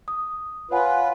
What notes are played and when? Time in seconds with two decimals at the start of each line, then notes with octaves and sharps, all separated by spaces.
0.08 D#6
0.71 F4 B4 C#5 F#5 G#5